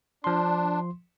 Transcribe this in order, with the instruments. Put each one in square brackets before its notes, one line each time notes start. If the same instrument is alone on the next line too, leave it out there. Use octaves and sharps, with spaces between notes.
[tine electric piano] F3 C6 [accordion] D4